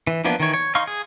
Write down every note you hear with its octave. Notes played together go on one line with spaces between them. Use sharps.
E3
E3 F3 A#3 B3 D4
D#3 E3 C#5
C#5
D#4 F5 C6 C#6 F6
G#4